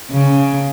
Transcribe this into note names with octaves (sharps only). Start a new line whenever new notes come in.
C#3